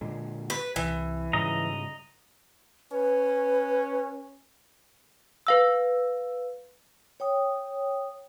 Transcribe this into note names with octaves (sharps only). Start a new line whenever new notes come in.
A#2 D3 G#3
B4
C2 E3
G#2 C#3 G3 D#5 A#5
C#4 B4
B4 F5 E6
C#5 G5 D#6